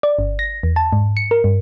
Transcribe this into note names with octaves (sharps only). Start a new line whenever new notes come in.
D5
G1
A#6
E2
A5
G#2
C#7
A#4
G2